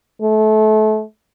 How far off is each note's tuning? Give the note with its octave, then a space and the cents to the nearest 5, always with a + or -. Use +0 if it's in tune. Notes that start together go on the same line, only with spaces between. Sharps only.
A3 -30